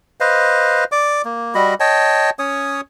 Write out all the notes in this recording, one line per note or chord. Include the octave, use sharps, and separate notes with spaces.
B4 C5 D#5 F5
D5 D6
A#3
G3 F#4 D#5 B5
C#5 D#5 G5 A5
C#4 C#5 D#6